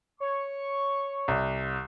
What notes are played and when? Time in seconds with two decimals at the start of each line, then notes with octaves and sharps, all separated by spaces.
0.20 C#5 C#6
1.28 C2